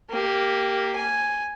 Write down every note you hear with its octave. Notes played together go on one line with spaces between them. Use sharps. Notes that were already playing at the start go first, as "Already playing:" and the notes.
A#3 G4
G#5